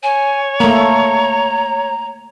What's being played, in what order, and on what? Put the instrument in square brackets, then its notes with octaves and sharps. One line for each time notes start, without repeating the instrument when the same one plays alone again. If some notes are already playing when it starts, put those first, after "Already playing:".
[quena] C#5 [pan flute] G#5
[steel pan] A3 A#3 [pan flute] A#5